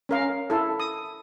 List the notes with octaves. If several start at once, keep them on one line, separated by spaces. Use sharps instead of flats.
C#4 A#4 F5
E4 A4
D#6